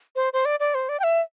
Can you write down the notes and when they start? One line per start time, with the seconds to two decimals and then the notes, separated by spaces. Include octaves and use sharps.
0.16 C5
0.33 C5
0.45 D5
0.60 D5
0.74 C5
0.89 D5
0.99 G5
1.03 E5